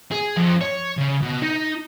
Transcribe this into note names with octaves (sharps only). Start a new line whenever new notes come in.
G#4
F2
C#5
C#3
B2
D#4